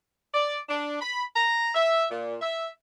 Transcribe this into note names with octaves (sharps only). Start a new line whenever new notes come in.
D5
D4
B5
A#5
E5
A#2
E5